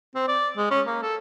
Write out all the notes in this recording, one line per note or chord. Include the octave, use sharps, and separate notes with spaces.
C4
D5
G#3
C#4
A#3
A4